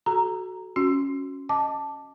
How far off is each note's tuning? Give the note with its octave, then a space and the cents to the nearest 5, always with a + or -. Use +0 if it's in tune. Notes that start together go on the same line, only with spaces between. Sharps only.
F#4 +0 A4 -35 A#5 +0
C#4 +0 F#4 -15
D#5 +0 A5 +0 D6 +0